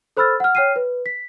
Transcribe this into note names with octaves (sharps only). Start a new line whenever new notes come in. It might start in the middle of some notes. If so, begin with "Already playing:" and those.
A4 C5 B5 E6 F6 A6
F#5 F6
C#5 G5 F6 C7 D#7
B4
B6